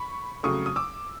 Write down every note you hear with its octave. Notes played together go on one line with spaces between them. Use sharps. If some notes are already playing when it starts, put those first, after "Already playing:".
Already playing: B5 C#6
F2 C#3 F#3 A3 C#6 D#6
D#6
D6 E6